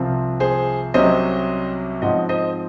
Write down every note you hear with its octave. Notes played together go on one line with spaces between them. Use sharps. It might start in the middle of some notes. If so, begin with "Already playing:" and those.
Already playing: C2 C3 F3 C4
G#4 C5
C2 C3 F#3 C#4 C5 D#5
G#2 F3 C4 D#5 F#5
C5 D#5